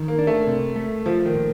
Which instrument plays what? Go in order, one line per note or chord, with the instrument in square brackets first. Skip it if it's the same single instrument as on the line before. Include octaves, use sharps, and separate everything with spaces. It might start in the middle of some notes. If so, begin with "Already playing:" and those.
Already playing: [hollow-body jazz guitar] D#3
[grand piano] A#3
[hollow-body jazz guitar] D4
[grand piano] A3
[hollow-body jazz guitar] C3
A3
[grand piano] F3 [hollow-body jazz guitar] A3
[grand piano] D#3
[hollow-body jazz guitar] A#2